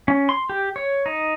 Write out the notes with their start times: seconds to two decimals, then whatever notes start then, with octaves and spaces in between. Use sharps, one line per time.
0.08 C#4
0.29 C6
0.50 G4
0.76 C#5
1.06 D#4